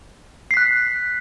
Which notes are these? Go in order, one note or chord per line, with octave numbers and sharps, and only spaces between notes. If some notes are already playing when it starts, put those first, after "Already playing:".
F#6 B6 C7